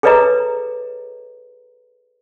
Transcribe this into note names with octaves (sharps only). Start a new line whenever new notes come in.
G#4 A4 B4 C#5 D#5 A#5